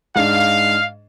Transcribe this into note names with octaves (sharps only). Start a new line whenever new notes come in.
G#2 G#3 D4 F5